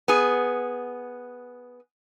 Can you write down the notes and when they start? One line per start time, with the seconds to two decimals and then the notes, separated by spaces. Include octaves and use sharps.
0.08 B3 G#4